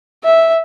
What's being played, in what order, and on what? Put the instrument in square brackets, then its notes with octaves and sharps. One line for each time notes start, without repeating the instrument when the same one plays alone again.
[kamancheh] E5